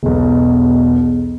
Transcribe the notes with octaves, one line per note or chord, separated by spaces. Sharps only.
E1 B1